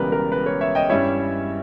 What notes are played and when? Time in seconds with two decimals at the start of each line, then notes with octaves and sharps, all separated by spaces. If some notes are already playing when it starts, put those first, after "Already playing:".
Already playing: E1 E2 C#3 G3 A#4 B4
0.12 A#4
0.32 B4
0.46 A#4 C#5
0.61 C#5 E5
0.75 D#5 G5
0.89 G2 G3 C#4 E4 C#5 E5